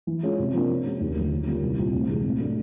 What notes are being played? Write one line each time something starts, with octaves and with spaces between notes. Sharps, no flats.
E3
G#3 C#4 F4
C3
F3 A#3 D4
F3
G#3 C#4 F#4
D#2
D3 F3 A3
D#3
G3 A#3 C#4 F4
C2
A#2 G3 C4 F4
D2
C3 E3 G#3
A2
F#3 A3 D4